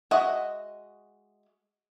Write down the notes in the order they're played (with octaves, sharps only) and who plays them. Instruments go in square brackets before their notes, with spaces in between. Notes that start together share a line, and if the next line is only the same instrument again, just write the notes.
[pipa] G#3 F#4 D#5 [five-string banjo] E5